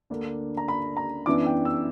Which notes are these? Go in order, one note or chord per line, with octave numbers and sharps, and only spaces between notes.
D2 D3 A#3 D4
A#5
B5
A#5
F#2 E3 B3 D4 D6
G5
E6